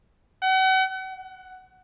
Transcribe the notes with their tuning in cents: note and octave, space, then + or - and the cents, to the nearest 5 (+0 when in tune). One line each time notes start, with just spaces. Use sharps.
F#5 +40
F#5 +5